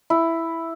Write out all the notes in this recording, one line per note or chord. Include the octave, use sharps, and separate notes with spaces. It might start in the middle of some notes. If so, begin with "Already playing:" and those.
E4